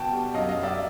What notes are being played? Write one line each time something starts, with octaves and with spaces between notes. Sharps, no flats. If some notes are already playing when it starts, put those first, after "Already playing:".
Already playing: B2 G5 A5
G3
F#2 D#5 F5
D#5 F5
F#2
D5 E5